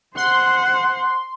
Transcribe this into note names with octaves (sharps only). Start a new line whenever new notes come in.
C5 F#5 C6